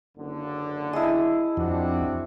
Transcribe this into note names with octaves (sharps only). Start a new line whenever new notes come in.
F#1 D3
E4 G#4 D#5 A5
F2 C4 D4 F#4